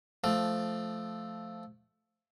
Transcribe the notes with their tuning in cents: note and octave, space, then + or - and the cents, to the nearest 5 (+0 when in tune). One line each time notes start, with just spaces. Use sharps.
F3 +0 A3 -5 D5 +25